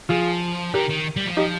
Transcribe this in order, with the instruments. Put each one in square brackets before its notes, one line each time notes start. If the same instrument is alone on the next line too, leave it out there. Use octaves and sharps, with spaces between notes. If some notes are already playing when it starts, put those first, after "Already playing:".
[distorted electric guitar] F3 [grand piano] F4 G#4
[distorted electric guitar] D#3 [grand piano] G4 A#4
[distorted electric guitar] D#3
G3
F3
[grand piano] D#4 G4